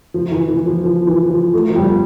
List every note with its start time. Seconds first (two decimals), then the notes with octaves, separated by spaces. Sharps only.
0.14 F3
0.32 E3
0.48 E3
0.66 F3
0.84 F3
1.07 E3
1.30 F3
1.54 A3
1.70 F3
1.76 G3